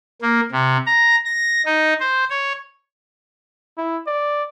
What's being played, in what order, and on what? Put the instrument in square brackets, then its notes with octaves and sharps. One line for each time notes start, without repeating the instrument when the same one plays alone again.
[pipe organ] A#3
C3
A#5
A#6
D#4
C5
C#5
[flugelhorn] E4
D5